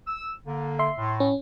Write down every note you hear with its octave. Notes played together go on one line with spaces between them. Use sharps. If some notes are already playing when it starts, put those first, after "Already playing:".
E6
D3 A#3
E5 C6
A2
C#4